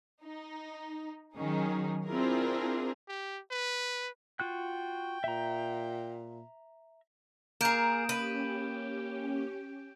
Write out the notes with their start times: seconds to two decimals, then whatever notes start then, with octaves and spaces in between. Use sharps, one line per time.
0.23 D#4
1.36 D#3 F#3 C#4 D#4 G#4
2.07 C4 D4 E4 F4 G#4 A#4
3.08 G4
3.51 B4
4.40 F4 F#4 G5 F#6
5.24 A#2 E5 A#5
7.61 A#3 G#4 A#4 D#6 G6 D7 E7
8.09 C#4 G4 B4